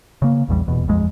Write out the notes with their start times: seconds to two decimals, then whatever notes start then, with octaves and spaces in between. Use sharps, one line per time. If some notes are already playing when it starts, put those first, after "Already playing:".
0.22 C#3 A#3
0.49 A#1 E2 G3
0.68 D#1 E2 B2
0.88 D#1 A#1 F2 G#3